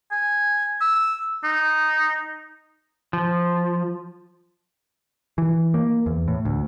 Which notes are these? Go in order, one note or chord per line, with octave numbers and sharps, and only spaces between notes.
G#5
E6
D#4
F3
E3
A#3
E2
A2
D2